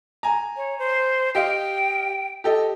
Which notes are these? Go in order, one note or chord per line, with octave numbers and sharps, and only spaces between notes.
G#5 A#5
C#5
C5
G4 D#5 F5 G5
G4 A4 D#5